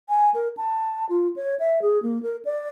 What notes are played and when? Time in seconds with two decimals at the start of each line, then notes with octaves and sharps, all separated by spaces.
0.09 G#5
0.34 A#4
0.57 A5
1.09 F4
1.36 C#5
1.60 E5
1.82 G#4
2.03 A#3
2.23 A#4
2.45 D5